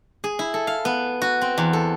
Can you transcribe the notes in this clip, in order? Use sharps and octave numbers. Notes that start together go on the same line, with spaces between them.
G#4
E4
A4
F5
B3
F#4
C4
E2
A4